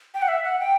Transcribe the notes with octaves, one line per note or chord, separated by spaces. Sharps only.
G5
F#5
E5
F#5
G5